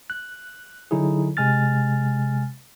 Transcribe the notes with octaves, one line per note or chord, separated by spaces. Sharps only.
F#6
D3 F#3 D#4 E4 G#4
C3 G#3 G#5 F6 A6